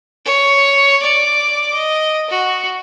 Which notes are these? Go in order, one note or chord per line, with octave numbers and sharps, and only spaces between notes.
C#5
D5 D6
D#5
F#4